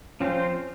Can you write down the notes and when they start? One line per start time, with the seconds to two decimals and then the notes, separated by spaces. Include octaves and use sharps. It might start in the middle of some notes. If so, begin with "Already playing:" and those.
0.20 F3 C4 C#4 F4 C5